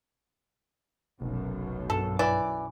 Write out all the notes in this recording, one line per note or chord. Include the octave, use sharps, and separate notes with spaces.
F1 B1 F#2
G2 A4
E3 D5